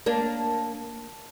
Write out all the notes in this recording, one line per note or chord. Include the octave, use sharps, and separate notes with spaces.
A#3 D4